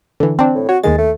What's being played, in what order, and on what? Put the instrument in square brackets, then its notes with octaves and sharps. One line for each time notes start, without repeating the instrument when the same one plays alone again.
[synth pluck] D3 E3
C4 D4
[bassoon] A2
[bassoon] F#4 [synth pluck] C#5
[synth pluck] D#2 D#3 A6 [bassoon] G#3
[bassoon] A3